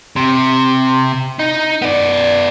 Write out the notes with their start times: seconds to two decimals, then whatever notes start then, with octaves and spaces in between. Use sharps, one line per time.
0.16 C3
1.39 D#4
1.82 B3 D5